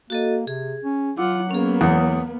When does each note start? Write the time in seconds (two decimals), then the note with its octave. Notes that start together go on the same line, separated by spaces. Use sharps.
0.10 A#3 F#4 A4 D#5
0.47 C3 G#4
0.84 C#4
1.17 F#3 F4 F#5 D6 E6
1.51 A#3 B3 C#4 G#4
1.81 E2 C#5 D#6